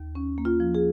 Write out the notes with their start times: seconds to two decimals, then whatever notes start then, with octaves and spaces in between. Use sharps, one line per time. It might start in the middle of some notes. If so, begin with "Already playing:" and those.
Already playing: D#2
0.15 C#4
0.38 A#3
0.45 F4
0.60 F3
0.75 G#4